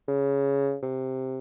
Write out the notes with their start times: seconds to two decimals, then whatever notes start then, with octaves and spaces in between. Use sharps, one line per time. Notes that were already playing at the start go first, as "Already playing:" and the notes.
0.08 C#3
0.83 C3